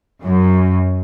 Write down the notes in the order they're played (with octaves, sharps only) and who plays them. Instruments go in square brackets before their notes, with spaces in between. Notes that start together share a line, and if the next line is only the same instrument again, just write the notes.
[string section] F#2